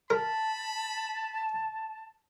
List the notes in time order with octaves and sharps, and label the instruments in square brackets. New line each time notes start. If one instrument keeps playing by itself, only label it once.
[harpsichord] A#4 [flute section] A5 [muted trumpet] B5